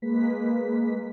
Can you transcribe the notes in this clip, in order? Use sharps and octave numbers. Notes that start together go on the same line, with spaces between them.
G#3 A#3 B4 B6